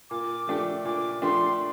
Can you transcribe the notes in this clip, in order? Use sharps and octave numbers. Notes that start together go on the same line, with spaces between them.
A#2 D6
F3 A3 D4 G4
A#2 D6
F3 A3 D4 G4 C6